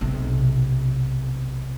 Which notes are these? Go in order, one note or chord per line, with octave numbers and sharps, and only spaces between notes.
B1 C3